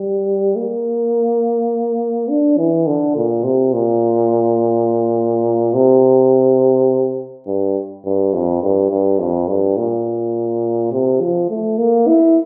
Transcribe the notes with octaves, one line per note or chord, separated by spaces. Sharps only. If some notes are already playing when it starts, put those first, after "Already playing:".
Already playing: G3
A#3
D4
E3
D3
A#2
C3
A#2
C3
G2
G2
F2
G2
G2
F2
G2
A#2
C3
F3
A3
A#3
E4